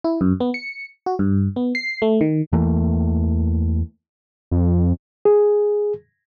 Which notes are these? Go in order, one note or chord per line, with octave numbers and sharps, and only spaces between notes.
E4
F#2
B3
C#7
F#4
G2
B3
C7
A3
D#3
E2 E3 A3 A#3
F2
G#4